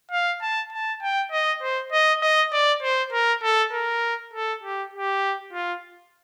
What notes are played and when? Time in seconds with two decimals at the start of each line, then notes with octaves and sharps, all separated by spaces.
0.12 F5
0.42 A5
0.72 A5
1.02 G5
1.32 D#5
1.62 C5
1.92 D#5
2.22 D#5
2.52 D5
2.82 C5
3.13 A#4
3.43 A4
3.72 A#4
4.33 A4
4.63 G4
4.94 G4
5.53 F4